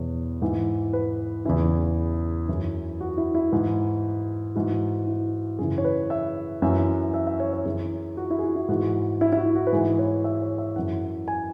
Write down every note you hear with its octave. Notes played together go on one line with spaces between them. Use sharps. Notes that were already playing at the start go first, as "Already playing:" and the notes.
Already playing: E2 B2 C#5
G#2 E3
B4
E2 C#3 E3 E4
F#2 E3
F#4
E4
E4
G#2 E3
G#2 E3 F#4
E4
F#2 C#3 E3 G#4
C#5
B4
E5
F#2 E3 E5
E5
E5
C#5
C#5
F#2 E3 G#4
F#4
E4
G#4
F#4
E4
G#2 E3 F#4
E4
E4
F#4
F#4
B4
G#2 E3 G#4
C#5
E5
C#5
E5
F#2 E3 F#5
G#5